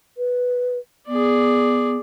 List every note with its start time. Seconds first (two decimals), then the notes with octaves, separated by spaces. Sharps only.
0.18 B4
1.08 B3 G#4 D5